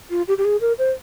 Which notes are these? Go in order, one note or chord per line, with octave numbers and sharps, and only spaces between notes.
F4
G4
G4
G#4
A#4
C5